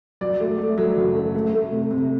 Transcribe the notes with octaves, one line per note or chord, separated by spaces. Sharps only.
F#3 D5
A3
A3
F#3
F#1
A3
A3
A3
C3
C3